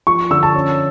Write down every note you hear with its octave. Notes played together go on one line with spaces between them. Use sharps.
F3 C#6
D3 E6
A5
C#4